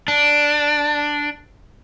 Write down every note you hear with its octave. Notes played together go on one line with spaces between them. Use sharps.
D4